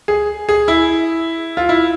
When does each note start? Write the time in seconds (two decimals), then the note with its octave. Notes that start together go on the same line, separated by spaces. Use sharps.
0.08 G#4
0.49 G#4
0.68 E4
1.57 F4
1.69 E4